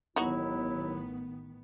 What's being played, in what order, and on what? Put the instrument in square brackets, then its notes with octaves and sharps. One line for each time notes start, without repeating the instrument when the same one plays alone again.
[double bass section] A1 D#3 B3 [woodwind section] D#2 F#3 E4 [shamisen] D#4 F#4